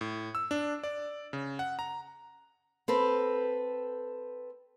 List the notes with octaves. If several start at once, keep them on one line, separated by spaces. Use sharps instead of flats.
A2
E6
D4
D5
C#3
F#5
A#5
C4 A4 B4